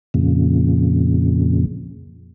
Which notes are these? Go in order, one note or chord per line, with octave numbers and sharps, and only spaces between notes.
F2 A#2 C#3